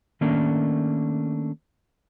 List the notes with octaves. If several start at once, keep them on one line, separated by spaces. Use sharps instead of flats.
D#3 A3 A#3 C#4 D4